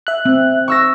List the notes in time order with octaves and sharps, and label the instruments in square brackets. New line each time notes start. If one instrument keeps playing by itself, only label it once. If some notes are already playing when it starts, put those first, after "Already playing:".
[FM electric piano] E5 F#6
[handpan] C4
[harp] C#6 E6 A#6